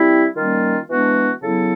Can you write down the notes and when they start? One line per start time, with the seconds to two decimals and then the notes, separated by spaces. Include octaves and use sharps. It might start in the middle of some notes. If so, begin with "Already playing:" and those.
Already playing: G3 C4 E4
0.36 D#3 G3 A#3 C#4 F4
0.88 E3 G#3 B3 D4 F#4
1.41 C#3 F#3 B3 E4 A4